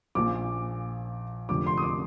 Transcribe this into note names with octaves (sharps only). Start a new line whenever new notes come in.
A#1 A#2 F3 D6
F1 F2 D3 D6
C6
D#6
D6